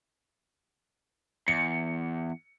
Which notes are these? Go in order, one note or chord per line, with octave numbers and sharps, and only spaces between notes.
E2 C#7